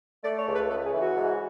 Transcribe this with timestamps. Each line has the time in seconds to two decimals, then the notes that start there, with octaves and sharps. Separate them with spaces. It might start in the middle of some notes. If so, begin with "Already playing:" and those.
0.24 A3 D5
0.39 C#5
0.48 C#2
0.55 B4
0.70 C#3 A4
0.86 G#4
0.94 E3
1.01 F#4
1.17 G#2